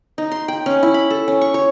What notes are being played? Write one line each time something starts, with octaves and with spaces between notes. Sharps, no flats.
D#4
C6
G5
C#4
E4
B5
A4
C#4
C#6
C#5